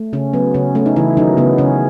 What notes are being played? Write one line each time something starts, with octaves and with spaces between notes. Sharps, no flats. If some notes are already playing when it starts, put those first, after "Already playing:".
Already playing: A3
C#3 C#4
F#3 B3
C#3 C#4
A3 C#4
D#4
C#3 E3 E4
D#3 F#3 D#4
C#3 B3
C#3 C#4